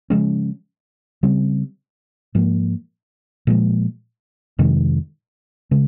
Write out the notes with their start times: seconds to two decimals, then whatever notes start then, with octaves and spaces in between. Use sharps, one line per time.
0.10 C#3 F3 G#3 C#4
1.23 C#3 G3 C4
2.35 G#2 F3 A#3
3.47 A#2 F3 G#3
4.59 F2 C3 D#3 G#3
5.71 C#3 G#3